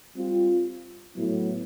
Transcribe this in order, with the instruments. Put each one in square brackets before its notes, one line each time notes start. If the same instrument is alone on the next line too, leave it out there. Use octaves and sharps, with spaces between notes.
[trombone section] G3 C4 F4
A2 F#3 B3 E4